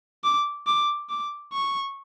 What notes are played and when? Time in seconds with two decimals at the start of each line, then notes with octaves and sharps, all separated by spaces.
0.24 D6
0.67 D6
1.10 D6
1.53 C#6